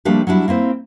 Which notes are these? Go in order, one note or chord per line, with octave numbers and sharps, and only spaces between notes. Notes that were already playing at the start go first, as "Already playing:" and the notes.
F3 G3 A3 A#3 D4 G4
F#3 G3 D4 E4
A#3 C4 E4 C5